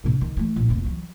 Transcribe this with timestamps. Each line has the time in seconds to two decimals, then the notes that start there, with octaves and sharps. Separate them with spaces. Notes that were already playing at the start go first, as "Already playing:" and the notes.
0.04 C3 D4
0.21 D#3
0.37 E3 A3
0.56 A#1
0.69 F1 D#2
0.85 E3 F#3